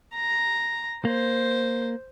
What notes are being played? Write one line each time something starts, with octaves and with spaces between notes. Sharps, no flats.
A#5
A#3 C5